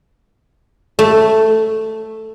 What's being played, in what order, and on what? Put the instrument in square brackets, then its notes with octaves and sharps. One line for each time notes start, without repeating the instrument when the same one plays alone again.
[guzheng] A3